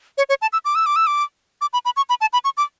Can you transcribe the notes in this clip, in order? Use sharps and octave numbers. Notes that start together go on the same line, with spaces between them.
C#5
C#5
A5
E6
D6
E6
D6
E6
D6
D6
B5
B5
C#6
B5
A5
B5
C#6
D6